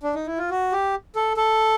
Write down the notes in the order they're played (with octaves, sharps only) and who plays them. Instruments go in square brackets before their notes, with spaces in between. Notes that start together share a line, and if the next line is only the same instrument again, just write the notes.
[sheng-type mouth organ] D4
D#4
E4
F4
F#4
G4
A4
A4